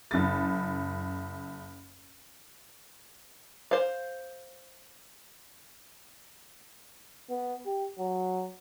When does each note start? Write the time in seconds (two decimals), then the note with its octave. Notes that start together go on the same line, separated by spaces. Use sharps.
0.11 F#1 A6
3.71 C5 F5
7.30 B3
7.66 G4
7.98 F#3